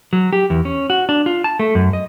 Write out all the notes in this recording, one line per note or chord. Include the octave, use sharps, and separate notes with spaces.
F#3
G4
E2
C#4
F#4
D4
F4
A5
A3
F#2
D#5